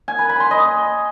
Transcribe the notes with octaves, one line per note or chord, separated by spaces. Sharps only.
G#5
B4
B5
C6
D#5